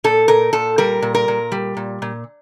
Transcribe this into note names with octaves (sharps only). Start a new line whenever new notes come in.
A#2 A4
A#2 A#4
A#2 A4
G3 A#4
A#2
A#4
A#2
G3
A#2
A#2